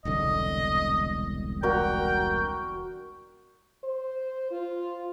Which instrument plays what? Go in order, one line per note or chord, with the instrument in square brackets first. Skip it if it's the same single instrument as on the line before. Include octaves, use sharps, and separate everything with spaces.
[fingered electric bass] E1 C2 D3 [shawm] D#5
[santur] F#4 A#4 D5 [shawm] G5
[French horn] C5
F4